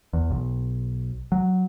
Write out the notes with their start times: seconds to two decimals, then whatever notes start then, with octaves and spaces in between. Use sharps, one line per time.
0.13 E2
0.31 B1
1.32 F#3